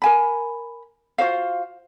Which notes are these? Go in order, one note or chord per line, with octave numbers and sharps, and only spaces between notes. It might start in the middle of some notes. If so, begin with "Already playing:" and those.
A#4 G#5 B5
F4 F#4 C5 F5